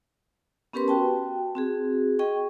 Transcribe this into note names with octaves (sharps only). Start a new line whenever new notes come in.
B3 C#4 G4 A#4 B4 C6
F#4 G5 A5
C4 F#4 G#4
G#4 D#5 G5 C#6